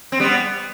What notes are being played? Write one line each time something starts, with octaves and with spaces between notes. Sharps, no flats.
C4
G3 B3